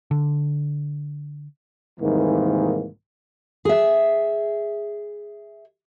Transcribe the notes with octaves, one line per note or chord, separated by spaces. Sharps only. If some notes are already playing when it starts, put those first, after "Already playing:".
D3
C2 G#2 D#3 E3 A#3
G#4 E5